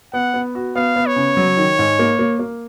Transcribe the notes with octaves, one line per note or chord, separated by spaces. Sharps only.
B3 F#5
B3
F#4
B3 F5
B3
C#5
C#3
F#3
D#3
G#2
A#3
A#3
A#3